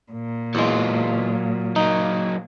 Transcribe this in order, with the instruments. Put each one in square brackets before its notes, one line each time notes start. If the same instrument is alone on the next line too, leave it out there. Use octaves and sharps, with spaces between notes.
[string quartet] A#2
[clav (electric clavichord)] E2 G#3 [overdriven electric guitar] F#3 F4
[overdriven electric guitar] F#3 A#3 [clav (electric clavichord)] D#4